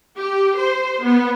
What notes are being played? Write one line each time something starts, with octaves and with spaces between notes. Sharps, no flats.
G4
C5
B3